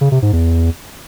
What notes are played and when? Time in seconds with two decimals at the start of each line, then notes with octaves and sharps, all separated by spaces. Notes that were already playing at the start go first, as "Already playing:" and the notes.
0.01 C#3
0.12 C3
0.22 G#2
0.33 E2